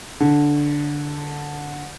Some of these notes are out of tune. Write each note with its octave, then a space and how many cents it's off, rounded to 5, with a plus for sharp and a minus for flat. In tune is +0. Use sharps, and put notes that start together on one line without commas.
D3 -5